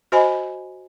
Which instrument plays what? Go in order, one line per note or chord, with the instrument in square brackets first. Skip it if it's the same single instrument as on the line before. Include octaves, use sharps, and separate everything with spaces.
[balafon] F#4 C5 D#5 G#5 B5